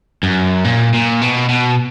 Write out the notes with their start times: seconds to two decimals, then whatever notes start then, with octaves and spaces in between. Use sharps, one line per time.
0.23 F#2
0.64 A#2
0.94 A#2
1.21 B2
1.49 B2